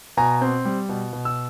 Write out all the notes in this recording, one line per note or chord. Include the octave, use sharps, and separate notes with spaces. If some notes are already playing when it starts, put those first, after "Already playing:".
B2 G#5 A#5
C4
G3
B2
B2
E6